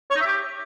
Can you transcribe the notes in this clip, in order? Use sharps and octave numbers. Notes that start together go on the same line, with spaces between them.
C#5
D#4
E5
G4